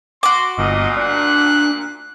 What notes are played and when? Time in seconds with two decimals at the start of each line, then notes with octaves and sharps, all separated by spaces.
0.23 F#4 C6 D6
0.58 G1 D2 A#2 D#5
0.97 D4 F#6